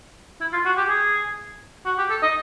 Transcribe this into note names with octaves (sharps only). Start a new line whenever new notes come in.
E4
F4
F#4
G4
G#4
F#4
G4
A4
D#5